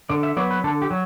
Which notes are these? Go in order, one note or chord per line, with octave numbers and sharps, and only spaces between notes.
D3 D5
E5
F#3 B3 D5
B4
D3 A4
G4
F#3